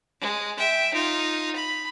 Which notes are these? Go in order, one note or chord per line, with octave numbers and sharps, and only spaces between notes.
G#3
E5 G5
D#4 F4
B5